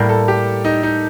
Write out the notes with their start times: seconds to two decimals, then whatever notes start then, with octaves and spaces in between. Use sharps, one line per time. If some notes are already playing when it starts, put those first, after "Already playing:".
Already playing: A2 G3 A#3 A#4
0.09 A4
0.28 G4
0.65 D#4
0.83 D#4